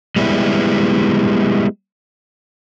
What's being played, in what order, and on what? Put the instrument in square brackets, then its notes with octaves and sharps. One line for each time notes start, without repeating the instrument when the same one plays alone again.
[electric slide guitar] G3 G#3 B3 E4